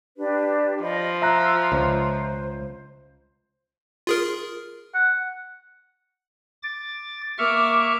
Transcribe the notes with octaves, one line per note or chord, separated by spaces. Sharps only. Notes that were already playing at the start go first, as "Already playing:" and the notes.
D4 G4 B4
F3 D5 D#5 B5
F4 E5 A#5 E6 F#6
C#2 C5
F4 G#4 A#4
F#5
D6 A6
A#3 E5 C#6 D6 F6